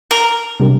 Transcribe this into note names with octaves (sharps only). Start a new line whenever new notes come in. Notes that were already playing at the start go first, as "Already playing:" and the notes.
A#4
C3 G3 D4 G4 A#4